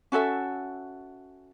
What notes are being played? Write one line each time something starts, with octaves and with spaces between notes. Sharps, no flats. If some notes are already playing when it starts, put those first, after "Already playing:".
C#4 F#4 A4 E5